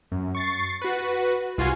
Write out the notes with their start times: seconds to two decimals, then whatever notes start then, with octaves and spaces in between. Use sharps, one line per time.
0.12 F#2
0.35 C#6 A6 C7
0.82 F#4 B4
1.58 C2 F4 F#4 G#5 C7